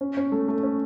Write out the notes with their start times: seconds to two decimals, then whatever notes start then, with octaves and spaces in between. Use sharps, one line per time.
0.01 C#4
0.17 C#4
0.32 A3
0.48 A3
0.63 C#4